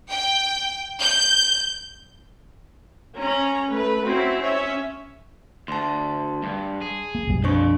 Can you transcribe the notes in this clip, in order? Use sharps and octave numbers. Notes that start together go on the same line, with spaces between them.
G5
G6
C#4 A#5
A3 B4
C4 C#4 E4 F#4
C#4 C#5 E5
D2 A5 C6
G2
G#4
A#3
B1 F#2 G3
F2 D4 C5 C#6